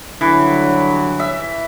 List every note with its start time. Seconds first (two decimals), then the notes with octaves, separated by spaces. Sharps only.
0.21 D3 E3 F#3 G3
1.20 E5